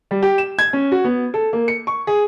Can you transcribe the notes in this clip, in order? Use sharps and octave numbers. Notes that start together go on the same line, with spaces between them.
G3
G4
E7
G#6
C#4
F#4
B3
A4
A#3
C#7
C#6
G#4